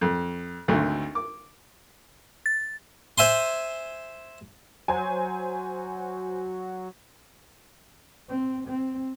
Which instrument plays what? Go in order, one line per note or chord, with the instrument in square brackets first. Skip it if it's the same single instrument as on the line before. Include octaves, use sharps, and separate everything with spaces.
[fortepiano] F2
G#1 D2 A3
D6
[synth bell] A6
[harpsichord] C5 E5 G#5 C6
[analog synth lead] F#3 [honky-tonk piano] C5 G#5
[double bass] C4
C4